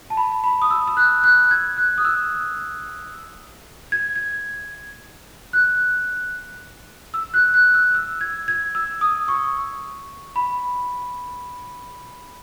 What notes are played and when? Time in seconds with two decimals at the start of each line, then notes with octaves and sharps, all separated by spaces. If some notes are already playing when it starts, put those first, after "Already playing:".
0.10 A5
0.17 B5
0.44 B5
0.62 D#6
0.71 E6
0.87 E6
0.97 F#6
1.24 F#6
1.51 G#6
1.78 F#6
1.98 D#6
2.05 E6
3.92 G#6
4.16 G#6
5.53 F#6
7.14 E6
7.34 F#6
7.54 F#6
7.74 E6
7.94 E6
8.21 G#6
8.48 G#6
8.75 E6
9.01 D#6
9.28 C#6
10.36 B5